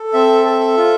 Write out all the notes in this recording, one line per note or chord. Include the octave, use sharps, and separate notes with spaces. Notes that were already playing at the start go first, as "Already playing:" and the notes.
Already playing: A4
C4 E5
A4
F4